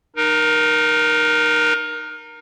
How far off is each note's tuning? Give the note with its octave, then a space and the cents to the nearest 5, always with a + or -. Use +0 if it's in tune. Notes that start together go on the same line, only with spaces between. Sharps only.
D#4 -20 A#4 +15